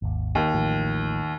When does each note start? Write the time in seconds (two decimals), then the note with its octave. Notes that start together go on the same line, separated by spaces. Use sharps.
0.02 G#1 D#2
0.35 D#2
0.54 A1 A2 F3